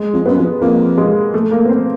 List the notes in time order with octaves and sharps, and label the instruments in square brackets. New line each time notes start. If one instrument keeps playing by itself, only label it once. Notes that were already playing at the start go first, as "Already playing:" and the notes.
Already playing: [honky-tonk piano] G#3
[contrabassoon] F2
[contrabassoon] F#2 [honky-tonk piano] B3
[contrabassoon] F2
[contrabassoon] F2 [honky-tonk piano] A#3
[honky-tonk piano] G#3
A3
A#3
B3
C4